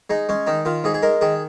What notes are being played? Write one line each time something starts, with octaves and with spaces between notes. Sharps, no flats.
G#3 D#4
G#3 C#4
D#3 D#4
D#3 F4
G#2 G#4
G#4
G#3 A#4
D#3 G#4